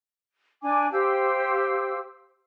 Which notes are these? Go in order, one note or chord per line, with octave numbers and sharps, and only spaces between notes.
D4 G#5 D6
G4 C5 F5 E6